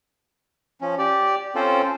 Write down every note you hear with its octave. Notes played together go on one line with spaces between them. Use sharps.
F3 C#4
G4 D5
C4 C#4 F4 A4 C5